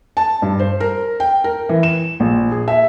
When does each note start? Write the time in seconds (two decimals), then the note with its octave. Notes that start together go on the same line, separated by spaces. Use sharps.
0.17 A5
0.42 G2
0.59 C5
0.80 A#4
1.20 G5
1.44 A#4
1.69 E3
1.83 E7
2.20 A#1
2.52 G#4
2.68 E5